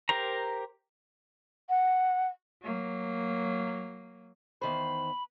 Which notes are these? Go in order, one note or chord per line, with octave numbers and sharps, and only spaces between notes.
G4 A#4 C5 A#5
F#5
F#3 A#3
E2 D#3 C5 B5